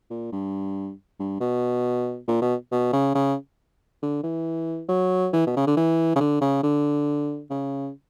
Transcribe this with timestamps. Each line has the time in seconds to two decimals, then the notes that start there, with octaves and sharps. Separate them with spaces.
0.10 A#2
0.32 G2
1.19 G2
1.41 B2
2.28 A#2
2.42 B2
2.72 B2
2.93 C#3
3.15 C#3
4.03 D3
4.24 E3
4.89 F#3
5.33 E3
5.47 B2
5.57 C#3
5.67 D3
5.77 E3
6.16 C#3
6.20 D3
6.41 C#3
6.63 D3
7.50 C#3